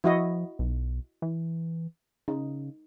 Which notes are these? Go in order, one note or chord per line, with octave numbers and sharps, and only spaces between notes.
F3 E4 F#4 D#5
B1
E3
C#3 D#4